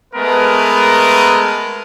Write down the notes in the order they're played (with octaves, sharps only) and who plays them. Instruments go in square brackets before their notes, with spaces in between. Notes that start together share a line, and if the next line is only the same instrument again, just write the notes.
[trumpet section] G#3 A3 B3 A#4 B4